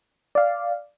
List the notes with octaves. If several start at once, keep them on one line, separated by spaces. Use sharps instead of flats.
D5 F5